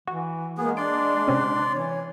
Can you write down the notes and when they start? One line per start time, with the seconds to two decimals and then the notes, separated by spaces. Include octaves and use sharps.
0.08 E3 F#4
0.58 G#3 A#3 B3 G#4
0.77 D4 D5 C6 D7
1.28 C3 C4 C#4
1.72 E3 C#5